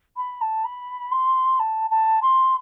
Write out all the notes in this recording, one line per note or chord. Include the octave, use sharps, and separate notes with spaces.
B5
A5
B5
C6
A5
A5
C6